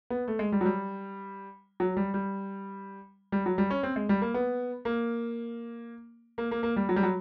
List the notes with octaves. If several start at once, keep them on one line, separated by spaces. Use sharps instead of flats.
B3
A3
G#3
G3
F#3
G3
F#3
G3
G3
G3
F#3
G3
C#4
C4
G#3
G3
A#3
B3
A#3
A#3
A#3
A#3
G3
F#3
G3
F#3